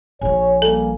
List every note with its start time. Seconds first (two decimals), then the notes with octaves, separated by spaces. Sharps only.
0.21 A#1 F3 C#5 G#5
0.62 G3 A#3 A4